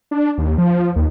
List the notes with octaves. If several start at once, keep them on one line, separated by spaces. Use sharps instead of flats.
D4
D#2
F3
D#2